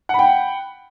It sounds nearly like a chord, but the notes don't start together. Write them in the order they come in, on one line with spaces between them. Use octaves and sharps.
F#5 B5 G5